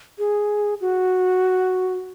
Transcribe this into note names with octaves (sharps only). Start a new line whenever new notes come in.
G#4
F#4